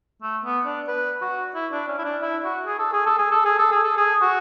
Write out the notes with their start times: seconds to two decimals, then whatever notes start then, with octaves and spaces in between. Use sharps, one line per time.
0.22 A3
0.44 B3
0.65 D4
0.88 B4
1.22 F#4
1.55 E4
1.72 D4
1.88 C#4
1.98 E4
2.05 D4
2.22 E4
2.44 F#4
2.66 G#4
2.79 A4
2.93 G#4
3.06 A4
3.19 G#4
3.31 A4
3.45 G#4
3.59 A4
3.72 G#4
3.84 A4
3.97 G#4
4.22 F#4